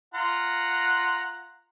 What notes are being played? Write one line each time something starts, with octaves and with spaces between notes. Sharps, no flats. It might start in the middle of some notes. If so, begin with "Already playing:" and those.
F4 F#5 A#5